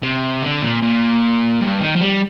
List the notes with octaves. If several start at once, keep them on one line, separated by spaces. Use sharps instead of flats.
C3
D3
A#2
A#2
G2
D#3
F3
G3